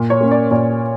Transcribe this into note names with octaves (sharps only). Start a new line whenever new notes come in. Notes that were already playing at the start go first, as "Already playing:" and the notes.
Already playing: A#2
C#5
A#3 C#4
D5
A#2 D5